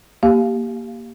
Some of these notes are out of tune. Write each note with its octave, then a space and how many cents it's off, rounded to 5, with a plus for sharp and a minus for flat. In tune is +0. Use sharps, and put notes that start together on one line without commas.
A#3 +0 G4 +0 F5 +0